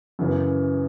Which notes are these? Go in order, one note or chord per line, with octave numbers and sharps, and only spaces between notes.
F#2 C#3 E3